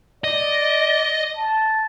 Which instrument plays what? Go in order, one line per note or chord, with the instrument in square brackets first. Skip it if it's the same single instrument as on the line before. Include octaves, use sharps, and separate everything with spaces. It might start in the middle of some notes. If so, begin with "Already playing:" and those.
[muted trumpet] D5 [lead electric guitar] D#5
[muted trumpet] A5